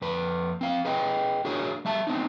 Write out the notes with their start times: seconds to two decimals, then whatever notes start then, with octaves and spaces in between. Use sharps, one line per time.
0.02 F2 B4
0.61 C4 F5
0.85 G#4 B4 D#5 G5
1.45 D4 F#4 G#4 A#4 C#5
1.85 G3 E5 A5
2.07 B3 C4 D4 D#4